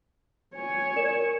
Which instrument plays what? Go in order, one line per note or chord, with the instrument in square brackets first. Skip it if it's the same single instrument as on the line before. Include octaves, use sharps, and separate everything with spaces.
[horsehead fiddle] C#5 G#5
[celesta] A#4 D5 E7